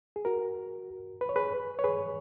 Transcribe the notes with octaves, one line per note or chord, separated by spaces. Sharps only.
G#4
F#4 A#4
B4
C#5
G#4 B4
C#5
G#4 B4